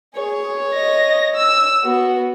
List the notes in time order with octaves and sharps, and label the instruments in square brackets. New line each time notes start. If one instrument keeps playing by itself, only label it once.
[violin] G#4 [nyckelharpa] C#5
[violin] D#5 A#6
E6
[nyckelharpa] B3 [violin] F#4